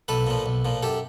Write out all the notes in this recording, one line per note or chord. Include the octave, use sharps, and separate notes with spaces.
B1 A4 B4
A#2 F3
B1
A#2 F3
F#2 G4 A4